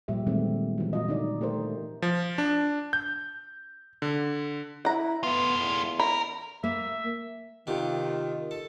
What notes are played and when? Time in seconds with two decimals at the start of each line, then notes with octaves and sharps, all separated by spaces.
0.08 A#2 F3 G3 G4 E5
0.27 A#2 D#3 E3 G#3 A3 C4
0.78 E3 F#3
0.93 A#2 F4 D#5
1.08 D3 D#4 D5
1.40 A#2 A3 G4 A#4 C5
2.02 F3
2.38 D4
2.93 G6
4.02 D3
4.85 E4 F#5 A#5
5.24 A3 B3 F4
5.59 E2
6.00 A#4 B5
6.64 A#3 E5
7.67 C3 D#3 B3 F4 G4
8.51 A4